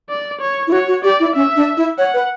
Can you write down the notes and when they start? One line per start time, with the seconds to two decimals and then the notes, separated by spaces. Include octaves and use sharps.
0.10 D5
0.41 C#5
0.67 E4
0.72 F#4 C#5
0.88 F#4
1.04 G4 D5
1.20 E4
1.35 C#4 E5
1.56 D4
1.77 E4
1.98 C#5 F#5
2.14 B4